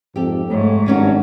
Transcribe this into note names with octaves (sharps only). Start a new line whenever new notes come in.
F2 G#2 G4 A4
G#2 A3 C#5
G#1 G2 F#3 C#4 D#4